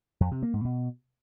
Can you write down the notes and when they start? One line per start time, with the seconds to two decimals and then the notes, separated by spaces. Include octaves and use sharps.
0.20 F2
0.31 C3
0.43 A#3
0.54 G#2
0.65 B2